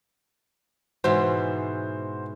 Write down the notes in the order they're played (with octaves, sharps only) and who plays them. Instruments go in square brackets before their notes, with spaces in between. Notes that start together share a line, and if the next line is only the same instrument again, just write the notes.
[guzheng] G#2 B2 E3 [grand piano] F#4 C5